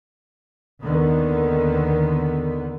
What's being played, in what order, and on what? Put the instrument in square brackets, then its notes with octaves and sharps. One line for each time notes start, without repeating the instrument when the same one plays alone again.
[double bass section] D#2 D3 D#3 B3